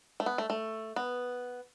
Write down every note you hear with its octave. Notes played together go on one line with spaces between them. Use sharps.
A3
B3
A3
A3
B3